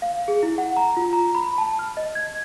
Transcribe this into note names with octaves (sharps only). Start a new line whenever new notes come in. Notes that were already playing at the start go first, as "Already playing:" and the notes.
F5
G#4
E4
F#5
A#5
F4
A#5
B5
A5
F6
D#5
G#6